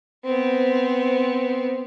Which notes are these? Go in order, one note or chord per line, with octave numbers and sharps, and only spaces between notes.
B3 C4